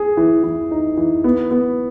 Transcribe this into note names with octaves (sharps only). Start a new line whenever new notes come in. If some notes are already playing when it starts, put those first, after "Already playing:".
Already playing: G#4
E3
E3
D#4
E3
B3
B3